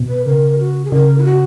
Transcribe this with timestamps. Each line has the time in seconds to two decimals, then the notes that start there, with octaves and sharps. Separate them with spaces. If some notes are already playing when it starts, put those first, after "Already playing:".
Already playing: B2
0.09 B4
0.25 C#3 A#4
0.59 F#4
0.85 G#4
0.92 C#3 A#4
1.18 E4
1.24 F#4